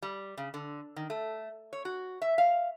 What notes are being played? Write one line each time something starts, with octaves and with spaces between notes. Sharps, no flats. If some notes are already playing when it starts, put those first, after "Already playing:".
G3
C#3
D3
D#3
A3
C#5
F#4
E5
F5